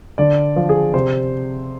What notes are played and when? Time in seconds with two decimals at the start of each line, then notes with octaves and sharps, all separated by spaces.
0.18 D3 D5
0.56 F3
0.69 G#4
0.94 C3 C5